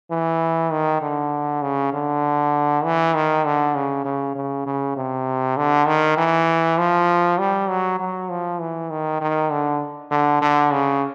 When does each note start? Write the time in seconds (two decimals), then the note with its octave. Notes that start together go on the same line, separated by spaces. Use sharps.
0.11 E3
0.72 D#3
1.02 D3
1.62 C#3
1.93 D3
2.84 E3
3.15 D#3
3.45 D3
3.75 C#3
4.05 C#3
4.35 C#3
4.66 C#3
4.96 C3
5.57 D3
5.87 D#3
6.17 E3
6.78 F3
7.38 G3
7.70 F#3
8.00 F#3
8.30 F3
8.60 E3
8.90 D#3
9.21 D#3
9.51 D3
10.11 D3
10.41 D3
10.72 C#3